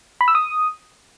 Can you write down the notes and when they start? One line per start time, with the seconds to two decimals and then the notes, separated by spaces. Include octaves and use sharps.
0.21 B5
0.28 E6
0.35 D#6